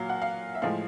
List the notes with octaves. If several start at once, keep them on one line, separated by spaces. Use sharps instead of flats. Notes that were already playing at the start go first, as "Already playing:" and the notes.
Already playing: A#2 F#3 F5
F#5
F5
E5
A2 F3 G#3 F5